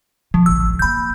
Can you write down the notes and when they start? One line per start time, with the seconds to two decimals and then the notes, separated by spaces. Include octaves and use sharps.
0.34 C#3 F3
0.46 A1 D2 E6
0.79 C#3 A#3 B5 G6